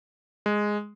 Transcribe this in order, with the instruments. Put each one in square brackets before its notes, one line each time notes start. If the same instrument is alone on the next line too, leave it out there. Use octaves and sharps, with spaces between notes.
[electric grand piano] G#3